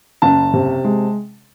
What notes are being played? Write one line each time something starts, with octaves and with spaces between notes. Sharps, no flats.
F#1 A5
C3
G#3